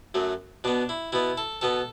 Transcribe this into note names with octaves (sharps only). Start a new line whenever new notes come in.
F#2 F#3 A3
B2 B3 D4
E4
B2 B3 E4
A4
B2 B3 A4